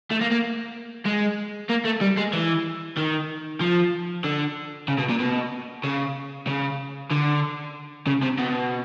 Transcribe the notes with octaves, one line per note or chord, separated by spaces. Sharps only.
A3
A#3
A#3
G#3
A#3
A3
G3
G#3
E3
D#3
F3
D3
C#3
B2
A#2
B2
C#3
C#3
D3
C#3
C3
B2